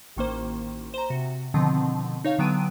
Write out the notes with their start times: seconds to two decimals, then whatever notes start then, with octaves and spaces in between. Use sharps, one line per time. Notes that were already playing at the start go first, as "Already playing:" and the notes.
0.16 A1 D#3 A#3 C5
0.94 C5 A#5
1.10 C3 F#4
1.54 B2 D3 D#3 F3 C4
2.25 D#4 C#5 F5
2.39 D3 F#3 B3 G5 D7 D#7